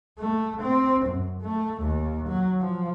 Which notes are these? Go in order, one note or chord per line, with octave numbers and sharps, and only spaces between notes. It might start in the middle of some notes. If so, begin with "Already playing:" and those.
A3
C4
F#2
A3
D#2
F#3
F3